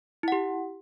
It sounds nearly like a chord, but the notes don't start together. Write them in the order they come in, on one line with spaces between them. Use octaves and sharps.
E4 F#5 G4